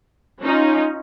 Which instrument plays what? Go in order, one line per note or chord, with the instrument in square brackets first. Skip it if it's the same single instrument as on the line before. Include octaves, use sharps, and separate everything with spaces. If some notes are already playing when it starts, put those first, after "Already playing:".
[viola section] C#4 D#4 F4